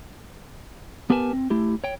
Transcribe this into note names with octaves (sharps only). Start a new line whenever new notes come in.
B3 G4 A#4 B4 G#5 A5
C4
A3 E4 G4
C#5 G5